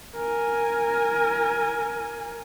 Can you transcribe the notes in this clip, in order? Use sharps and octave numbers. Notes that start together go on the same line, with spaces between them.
A#4 G#5